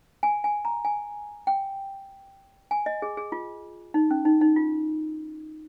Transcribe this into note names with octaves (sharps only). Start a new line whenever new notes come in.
G#5
G#5
A#5
G#5
G5
G#5
D#5
G#4
G#4
F4
D#4
C#4
D#4
D#4
F4